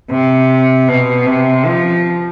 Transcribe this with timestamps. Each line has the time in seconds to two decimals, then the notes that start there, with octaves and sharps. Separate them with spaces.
0.10 C3
0.88 B2
1.26 C3
1.66 F3